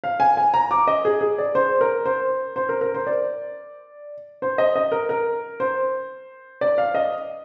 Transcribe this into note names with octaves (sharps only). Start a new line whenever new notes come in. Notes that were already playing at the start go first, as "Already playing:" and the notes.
F5
G#5
G#5
A#5
D6
D#5
G#4
G#4
D5
C5
A#4
C5
C5
A#4
A#4
C5
D5
C5
D#5
D#5
A#4
A#4
C5
D5
F5
D#5